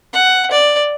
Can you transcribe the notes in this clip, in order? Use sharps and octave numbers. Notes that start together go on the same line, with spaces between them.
F#5
D5